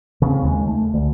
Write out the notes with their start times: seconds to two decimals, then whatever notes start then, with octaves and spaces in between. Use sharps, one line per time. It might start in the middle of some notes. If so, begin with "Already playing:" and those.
0.22 C#3 C4
0.42 D#2 G#3
0.67 A3
0.94 D2